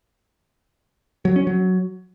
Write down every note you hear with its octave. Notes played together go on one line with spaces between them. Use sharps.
F#3
C#4
F#3